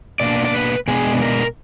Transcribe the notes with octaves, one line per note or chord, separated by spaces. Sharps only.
B2 A#3 D4 D5
D5
B4
B2 G#3 B3 D4 G#4
A#4